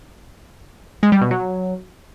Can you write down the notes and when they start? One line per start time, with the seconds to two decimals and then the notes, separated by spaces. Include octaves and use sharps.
1.03 G#3
1.12 G3
1.21 B2
1.31 F#3